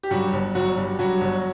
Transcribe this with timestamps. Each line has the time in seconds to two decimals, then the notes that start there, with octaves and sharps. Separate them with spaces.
0.03 G4
0.11 G2 F#3 F#4
0.33 G1
0.55 G1 F#3 F#4
0.77 G2
0.99 G2 F#3 F#4
1.21 G1